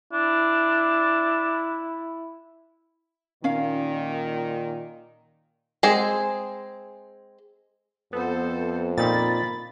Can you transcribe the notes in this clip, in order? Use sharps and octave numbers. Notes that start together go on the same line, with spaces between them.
D4 E4
A#2 D#3 C#4 F5
G#3 C4 G#4
F2 B3 A4 C5
A#2 A#3 C4 D#4 B5 A6